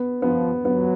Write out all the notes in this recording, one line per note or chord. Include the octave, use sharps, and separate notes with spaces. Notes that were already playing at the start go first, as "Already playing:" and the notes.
Already playing: B3
F3 B3
F#3 B3